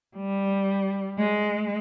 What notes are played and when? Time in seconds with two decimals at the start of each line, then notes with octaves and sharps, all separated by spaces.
0.17 G3
1.18 G#3